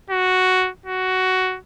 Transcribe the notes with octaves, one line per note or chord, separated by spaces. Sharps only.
F#4
F#4